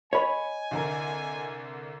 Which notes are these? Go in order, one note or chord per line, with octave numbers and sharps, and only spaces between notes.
C#5 D#5 G#5 B5
C2 D3 A#4